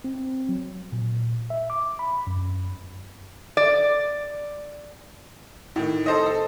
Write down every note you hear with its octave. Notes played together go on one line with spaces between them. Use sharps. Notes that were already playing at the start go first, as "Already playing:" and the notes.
C4
F#3
A#2
E5
D6
B5
F#2
D5
A2 D#3
A4 C5 D#5
A4